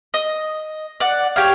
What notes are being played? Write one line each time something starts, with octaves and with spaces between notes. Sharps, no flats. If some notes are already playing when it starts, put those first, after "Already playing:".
D#5
D5 F#5
G4 C#5 F5